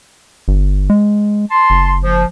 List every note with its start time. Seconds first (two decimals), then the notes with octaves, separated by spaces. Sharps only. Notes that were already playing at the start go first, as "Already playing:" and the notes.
0.48 G1
0.90 G#3
1.51 A5 C6
1.70 F#1
2.02 F3